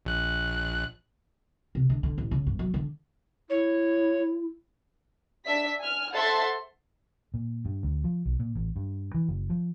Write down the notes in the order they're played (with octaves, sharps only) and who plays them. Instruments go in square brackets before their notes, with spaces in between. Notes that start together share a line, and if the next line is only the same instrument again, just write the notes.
[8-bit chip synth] A#1 F#6
[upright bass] C3
D3
D3
A1
C#3
G2
F#3
D3
[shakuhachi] E4 [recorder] C#5
[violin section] D4 E5 B6
G#5 F6
A4 C5 E5 F#5 C6 A6
[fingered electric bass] A#2
G2
D2
F3
B1
A#2
A1
G2
E3
F#1
F3